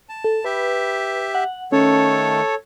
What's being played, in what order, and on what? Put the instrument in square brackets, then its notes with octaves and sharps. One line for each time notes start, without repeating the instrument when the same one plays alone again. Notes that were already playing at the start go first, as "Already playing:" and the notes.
[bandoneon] A5
[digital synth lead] A4
[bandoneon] G4 E5 [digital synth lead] B4
[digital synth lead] F#5
[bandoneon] D#3 A3 [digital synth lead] C#4 [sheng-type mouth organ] A4 C#5